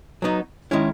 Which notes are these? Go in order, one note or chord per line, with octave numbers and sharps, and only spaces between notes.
F#3 B3 D#4
D#3 G#3 C#4 E4